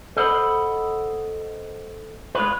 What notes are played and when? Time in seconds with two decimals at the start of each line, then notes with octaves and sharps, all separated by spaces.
0.17 A4 C5 D#5 F#5 A#5 B5
2.35 G#3 F4 B4